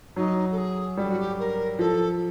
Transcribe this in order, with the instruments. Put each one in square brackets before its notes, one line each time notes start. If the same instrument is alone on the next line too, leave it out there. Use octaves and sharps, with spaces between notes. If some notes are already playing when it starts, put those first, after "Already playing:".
[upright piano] F#3 [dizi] D#4
[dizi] A4
G#4
[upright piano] G3 [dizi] G4
[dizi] F#4
G4
A#4
[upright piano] F3 [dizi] A4